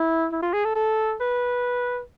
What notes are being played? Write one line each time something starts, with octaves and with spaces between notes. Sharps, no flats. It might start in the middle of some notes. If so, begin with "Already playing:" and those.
Already playing: E4
E4
F4
G#4
A4
A4
B4